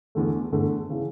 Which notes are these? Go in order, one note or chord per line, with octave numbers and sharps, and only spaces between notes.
E2 D3 A3
E2 D3 A3
C#3 E3